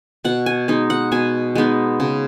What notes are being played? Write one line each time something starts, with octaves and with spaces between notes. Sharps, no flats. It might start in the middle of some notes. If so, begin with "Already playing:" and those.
B2 F#5
G#5
G#3 B3 D#4
F#5
B2 G#5
G#3 B3 D#4
C#3